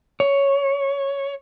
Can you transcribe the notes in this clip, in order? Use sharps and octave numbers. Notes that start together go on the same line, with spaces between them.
C#5